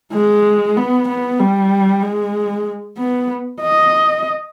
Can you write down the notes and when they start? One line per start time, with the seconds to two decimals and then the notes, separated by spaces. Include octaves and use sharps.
0.13 G#3
0.77 B3
1.09 B3
1.40 G3
2.03 G#3
2.98 B3
3.61 D#5